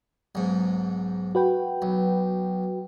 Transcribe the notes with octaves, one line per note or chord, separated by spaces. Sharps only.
B1 G#2
F#4 B4 G5
B1